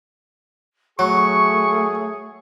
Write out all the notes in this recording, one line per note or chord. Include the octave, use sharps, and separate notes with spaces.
F#3 A3 G#4 C#6